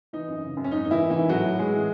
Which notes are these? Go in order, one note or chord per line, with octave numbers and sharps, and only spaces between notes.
E3 D#4
F#2
C#3
F#2
C#4
G#2 D#4
D#3 D#4
E3 E4
D#3
G#2 E3 E4
A2 F#3 F#4
E3
E3 G#3 G#4
A2